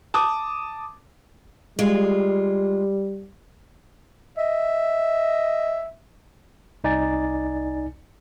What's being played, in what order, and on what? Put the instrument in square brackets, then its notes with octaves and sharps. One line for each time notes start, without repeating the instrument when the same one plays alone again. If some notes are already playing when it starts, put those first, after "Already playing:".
[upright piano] A5 D6 D#6
[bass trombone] G3 [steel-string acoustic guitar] G#3 F4
[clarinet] D#5 [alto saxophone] E5
[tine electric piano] C2 D#4 D5 G#5 A6